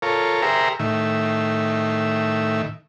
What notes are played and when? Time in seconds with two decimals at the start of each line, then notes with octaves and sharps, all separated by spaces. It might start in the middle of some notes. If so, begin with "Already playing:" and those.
0.02 F4 A4 A#4 C#5
0.42 G4 G#4 A#4 C5 E5 A#5
0.79 A2 D#3 E5